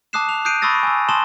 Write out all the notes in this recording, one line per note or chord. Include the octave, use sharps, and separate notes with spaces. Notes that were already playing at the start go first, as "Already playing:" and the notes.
A5 D6 D#6 F#6 C7 E7
F7
D#6 F#6 G6 C7 D7 D#7
B5 C#6 D#6 E6 A6 A#6
G#5 E6
A5 C6 D#6 E7 G7